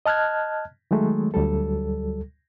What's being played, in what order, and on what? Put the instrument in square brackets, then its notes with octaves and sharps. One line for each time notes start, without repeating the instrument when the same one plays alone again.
[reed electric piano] D#5 A5 F6 F#6 G#6
D#3 F#3 G#3 A3
D2 F#3 G3 A4